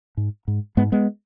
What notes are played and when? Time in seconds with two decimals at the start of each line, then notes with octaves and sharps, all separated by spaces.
0.17 G#2
0.48 G#2
0.77 G#2 G#3 B3
0.92 G#3 B3